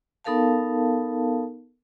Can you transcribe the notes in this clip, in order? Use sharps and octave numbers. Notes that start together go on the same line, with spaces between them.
B3 D#4 A4 A#4 F5 A5